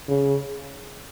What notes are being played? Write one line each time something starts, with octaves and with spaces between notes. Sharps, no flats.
C#3